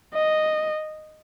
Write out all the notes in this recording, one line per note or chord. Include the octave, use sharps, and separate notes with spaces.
D#5